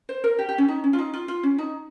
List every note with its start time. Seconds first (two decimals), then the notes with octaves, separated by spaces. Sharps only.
0.09 C5
0.24 A#4
0.38 G4
0.49 G4
0.58 C#4
0.68 D#4
0.84 C#4
0.93 F4
0.99 D#4
1.13 F4
1.28 F4
1.43 C#4
1.58 D#4